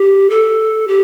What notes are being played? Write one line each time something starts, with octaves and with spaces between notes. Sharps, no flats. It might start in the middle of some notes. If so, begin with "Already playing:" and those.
Already playing: G4
A4
G4